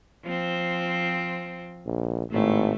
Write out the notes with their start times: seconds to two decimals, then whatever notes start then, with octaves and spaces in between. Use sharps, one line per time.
0.24 F3 C4
1.85 A#1
2.31 G#1 A2 A3